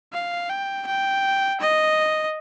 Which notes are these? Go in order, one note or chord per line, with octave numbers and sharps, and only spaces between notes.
F5
G5
G5
D#5